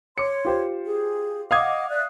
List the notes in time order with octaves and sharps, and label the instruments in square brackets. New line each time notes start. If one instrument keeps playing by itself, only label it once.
[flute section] C#5 C6 [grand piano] D6 C#7
[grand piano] F4 G4 C5
[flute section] G#4
[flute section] D#5 F#5 D6 [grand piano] F5 D#6 G#6
[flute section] D5 E5 F#6